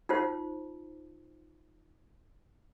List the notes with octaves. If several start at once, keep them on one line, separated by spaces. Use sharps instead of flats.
D#4 F4 C5